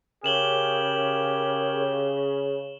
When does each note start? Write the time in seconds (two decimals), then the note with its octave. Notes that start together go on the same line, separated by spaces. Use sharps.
0.24 C#3 G4 A#4 C#5 E7 F#7 G7